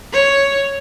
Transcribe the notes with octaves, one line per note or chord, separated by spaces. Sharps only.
C#5